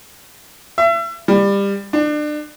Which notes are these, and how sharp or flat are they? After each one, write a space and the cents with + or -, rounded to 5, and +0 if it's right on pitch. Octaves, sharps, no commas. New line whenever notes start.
E5 +35
G3 +25
D4 +30